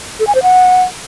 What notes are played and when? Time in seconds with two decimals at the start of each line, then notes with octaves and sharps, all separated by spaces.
0.20 A4
0.27 G#5
0.35 C5
0.43 F#5